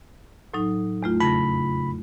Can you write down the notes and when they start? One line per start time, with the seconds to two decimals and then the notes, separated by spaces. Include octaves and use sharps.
0.54 A2 F#3 D#4
1.03 E2 A3 F4
1.20 F2 C#3 B5 A#6